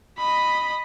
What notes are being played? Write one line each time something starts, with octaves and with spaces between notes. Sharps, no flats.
D#5 B5